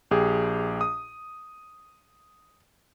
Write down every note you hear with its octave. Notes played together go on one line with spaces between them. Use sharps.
A#1 G4 G#4
D#6